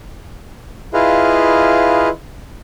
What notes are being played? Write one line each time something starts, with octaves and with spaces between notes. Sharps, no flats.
E4 F4 G#4 B4 D#5 F5